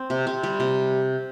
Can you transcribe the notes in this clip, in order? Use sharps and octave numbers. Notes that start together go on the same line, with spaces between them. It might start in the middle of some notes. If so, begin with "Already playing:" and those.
Already playing: C4
C3
C3 C4
G3
C3